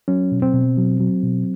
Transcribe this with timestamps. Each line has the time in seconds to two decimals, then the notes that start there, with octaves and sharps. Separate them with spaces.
0.08 F#3 C#4
0.32 B2
0.42 C4
0.54 B2
0.78 F#3
1.00 F#3
1.23 B2